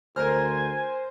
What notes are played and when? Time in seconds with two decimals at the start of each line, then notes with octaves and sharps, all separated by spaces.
0.16 D2 A#4 C5 G#5 A#5 F6